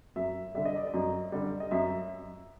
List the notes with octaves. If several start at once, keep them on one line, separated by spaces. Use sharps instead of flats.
F#2 E5
D3 G3 E5
D#5
D5
D#5
F#2
D3 G3
D#5
F#2 E5